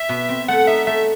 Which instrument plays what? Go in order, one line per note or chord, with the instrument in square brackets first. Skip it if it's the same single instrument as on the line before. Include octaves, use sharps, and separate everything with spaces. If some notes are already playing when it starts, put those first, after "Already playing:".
Already playing: [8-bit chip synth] E5
[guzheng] B2
C4
[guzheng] A3 [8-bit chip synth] F#5
[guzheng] D#4 [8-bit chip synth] E5
[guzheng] A3 [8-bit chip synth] E5